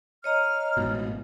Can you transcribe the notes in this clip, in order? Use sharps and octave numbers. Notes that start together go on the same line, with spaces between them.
C#5 D#5 A#5 F6
A1 G#2 B2